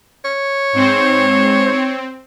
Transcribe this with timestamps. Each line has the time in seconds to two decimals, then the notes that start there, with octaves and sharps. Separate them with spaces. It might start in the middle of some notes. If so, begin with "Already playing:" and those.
0.25 C#5
0.73 G#2 C4 C5
1.72 C4